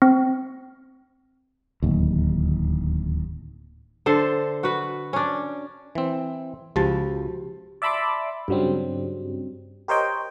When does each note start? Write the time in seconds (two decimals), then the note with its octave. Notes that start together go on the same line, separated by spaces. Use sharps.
0.02 C4
1.82 D1 D#2
4.06 D3 A4 C5
4.63 F#4 B4
5.13 C#4 D4
5.95 E3 C4
6.76 C#2 F3 F#4 G4 A5
7.82 D5 E5 A5 B5 C6 D6
8.48 G2 C#3 F#3 G3 C4
9.88 G4 A#4 C5 C#5 D#5 G5